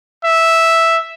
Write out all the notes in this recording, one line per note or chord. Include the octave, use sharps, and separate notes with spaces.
E5